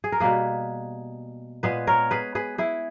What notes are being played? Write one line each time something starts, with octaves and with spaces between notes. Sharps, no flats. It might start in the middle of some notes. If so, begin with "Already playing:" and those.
G#4
A#4
B2 G3 A#3 G#4 B4
A#2 G#3 B3 G#4 B4
A#4 C#5
G#4 B4
G#4 B4
E4 G#4